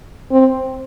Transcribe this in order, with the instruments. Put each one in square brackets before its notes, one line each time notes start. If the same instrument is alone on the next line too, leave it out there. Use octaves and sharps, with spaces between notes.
[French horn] C4